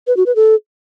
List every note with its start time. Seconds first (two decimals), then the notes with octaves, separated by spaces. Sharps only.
0.07 B4
0.17 F#4
0.26 B4
0.36 A4